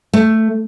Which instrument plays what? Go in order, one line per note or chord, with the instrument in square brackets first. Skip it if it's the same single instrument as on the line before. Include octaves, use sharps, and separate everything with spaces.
[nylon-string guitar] A3